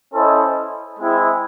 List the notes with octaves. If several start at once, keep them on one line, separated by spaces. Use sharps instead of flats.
C#4 E4 A4 C5 D#5
G#3 C4 E4 G#4